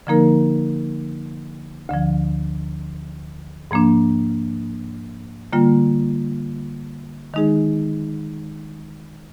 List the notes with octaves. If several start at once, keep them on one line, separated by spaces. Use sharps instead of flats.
D3 F3 A#3 D#4 A#4
D2 D3 F3
G#2 F3 A#3 D4
D3 G3 A#3 F4
D#3 G#3 D#4 G#4